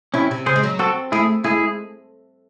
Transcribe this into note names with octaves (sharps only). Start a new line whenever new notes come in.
C3 C#4 E4
C3
C#3 G#4 C5
G#3
F#3
C4 F#4 A4
A3 E4 G#4
G#3 E4 G#4